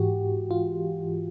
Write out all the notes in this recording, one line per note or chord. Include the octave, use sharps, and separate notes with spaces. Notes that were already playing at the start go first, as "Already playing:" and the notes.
Already playing: G#2 E3 F#4 G4
F4